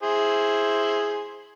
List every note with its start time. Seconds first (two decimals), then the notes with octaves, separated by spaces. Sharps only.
0.03 E4 G#4 C5